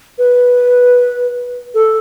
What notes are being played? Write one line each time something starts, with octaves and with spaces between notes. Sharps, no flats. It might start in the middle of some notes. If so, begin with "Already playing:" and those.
B4
A4